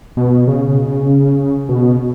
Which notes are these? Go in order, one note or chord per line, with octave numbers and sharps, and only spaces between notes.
B2
C#3
B2